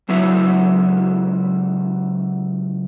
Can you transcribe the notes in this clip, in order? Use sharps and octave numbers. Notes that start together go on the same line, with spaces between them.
C#2 F#3 E4 F#4 E5